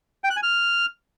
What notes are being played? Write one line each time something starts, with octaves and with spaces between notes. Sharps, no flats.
G5
F#6
G#5
F6